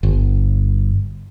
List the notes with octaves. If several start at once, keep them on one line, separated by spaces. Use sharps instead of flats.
G1